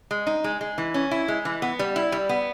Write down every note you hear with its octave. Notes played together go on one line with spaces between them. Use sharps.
G#3
D#4
G#3
G#3
E3
C#4
E4
G#3
E3
B3
G3
E4
G3
B3